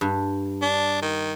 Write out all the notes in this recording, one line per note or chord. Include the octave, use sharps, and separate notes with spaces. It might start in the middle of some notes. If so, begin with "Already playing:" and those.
G2
D4
D#3